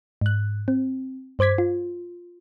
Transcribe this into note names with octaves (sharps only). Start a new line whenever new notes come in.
G#2 F#6
C4
G2 C5 D6 G#6 B6
F4